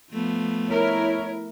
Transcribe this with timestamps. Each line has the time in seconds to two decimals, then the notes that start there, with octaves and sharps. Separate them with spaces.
0.12 F3 A3 B3
0.67 E4 A#4 C#5